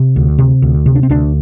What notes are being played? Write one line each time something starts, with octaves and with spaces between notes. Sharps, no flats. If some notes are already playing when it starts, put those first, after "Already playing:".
Already playing: C3
D2
C3
D2
C3
D4
C4
D2 D4